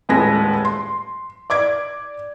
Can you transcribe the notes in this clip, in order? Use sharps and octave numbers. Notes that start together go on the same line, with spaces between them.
D#1 A2 G#3 B4 A#6
C6
D5 D6 G#6 D7